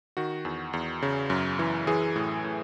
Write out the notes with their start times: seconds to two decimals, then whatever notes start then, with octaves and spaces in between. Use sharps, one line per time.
0.17 D#3 F#4
0.45 E2
0.73 E2
1.02 C#3
1.30 F#2
1.59 E3
1.87 E3 G#4
2.16 A2
2.44 A2